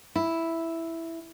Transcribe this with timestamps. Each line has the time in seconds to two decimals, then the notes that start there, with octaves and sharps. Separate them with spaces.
0.16 E4